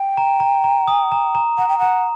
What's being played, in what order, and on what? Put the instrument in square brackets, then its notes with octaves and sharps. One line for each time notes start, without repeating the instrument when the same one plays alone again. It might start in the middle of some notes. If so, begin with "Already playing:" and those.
Already playing: [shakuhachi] G5
[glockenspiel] A#5
A#5
A#5
D#6
A#5
A#5
[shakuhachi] F#5 [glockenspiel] A#5
[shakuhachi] G5
[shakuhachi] F#5 [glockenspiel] A#5